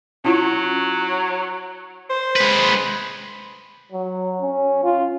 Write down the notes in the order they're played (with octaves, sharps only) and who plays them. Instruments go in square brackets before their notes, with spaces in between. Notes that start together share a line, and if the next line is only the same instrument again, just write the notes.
[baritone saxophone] F#3 [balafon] C#4 E4 F4
[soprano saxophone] C5
[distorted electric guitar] G#3 B4
[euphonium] F#3
C#4
F4